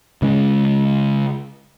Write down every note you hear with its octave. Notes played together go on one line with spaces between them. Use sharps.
C#3 G#3 C#4